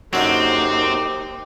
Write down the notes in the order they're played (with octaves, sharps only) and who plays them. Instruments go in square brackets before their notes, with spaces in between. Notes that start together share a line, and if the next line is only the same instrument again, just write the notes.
[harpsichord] F#2 D3 [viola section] A#3 D#4 C5 [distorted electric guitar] C4 [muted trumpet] G4